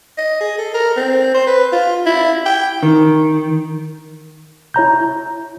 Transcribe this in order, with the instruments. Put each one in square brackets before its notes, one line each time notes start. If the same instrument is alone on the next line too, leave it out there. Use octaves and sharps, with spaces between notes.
[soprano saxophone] D#5
G#4
A4
A#4
C4
C5
B4
F4
E4
G5
[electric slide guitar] D#3
[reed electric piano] E4 C#5 A#5 G6